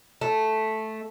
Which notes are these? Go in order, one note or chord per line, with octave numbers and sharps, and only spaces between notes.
A3